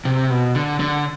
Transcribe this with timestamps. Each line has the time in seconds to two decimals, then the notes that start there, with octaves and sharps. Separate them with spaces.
0.05 C3
0.30 B2
0.55 D3
0.80 D3